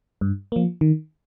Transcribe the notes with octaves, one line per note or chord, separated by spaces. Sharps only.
G2
F3 A#3
D#3